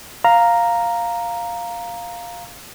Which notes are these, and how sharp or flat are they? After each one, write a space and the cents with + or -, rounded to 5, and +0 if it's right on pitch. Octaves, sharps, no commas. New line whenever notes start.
F5 +0 A#5 +0